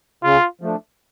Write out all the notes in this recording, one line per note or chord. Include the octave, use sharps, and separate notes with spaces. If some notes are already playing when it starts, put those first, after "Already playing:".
C#3 F4
F3 A3 D4